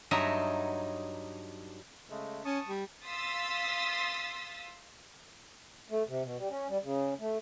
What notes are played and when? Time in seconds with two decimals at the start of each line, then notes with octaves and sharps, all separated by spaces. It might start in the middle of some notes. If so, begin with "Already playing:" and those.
0.11 G2 F#3 D#4 E5 A#5
2.10 C#3 G#3 A3
2.45 C#4 A5 C#6 D#6
2.67 G3
3.06 F5 C6 D#6 E6 A6 B6
5.90 A3
6.08 C3
6.23 B2
6.38 G3
6.50 C#4
6.69 G3
6.83 C#3
7.19 A3